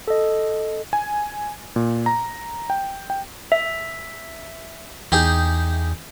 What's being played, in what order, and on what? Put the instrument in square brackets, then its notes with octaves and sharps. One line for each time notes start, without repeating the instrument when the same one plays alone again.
[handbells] A4 D#5
[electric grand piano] G#5
A#2
A#5
G5
G5
[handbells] E5
[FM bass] E2 [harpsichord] D#4 G4 G#4